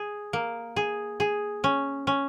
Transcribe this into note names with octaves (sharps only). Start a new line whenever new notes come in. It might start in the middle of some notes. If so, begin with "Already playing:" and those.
Already playing: G#4
A#3
G#4
G#4
C#4
C#4